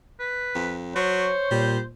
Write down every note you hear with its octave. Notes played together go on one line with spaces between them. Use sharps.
B4
F2
F#3 C5 C#5 C#6
A#2 G3